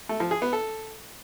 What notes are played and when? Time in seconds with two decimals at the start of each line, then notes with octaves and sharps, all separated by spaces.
0.09 A3
0.20 F3
0.31 G#4
0.42 B3
0.53 A4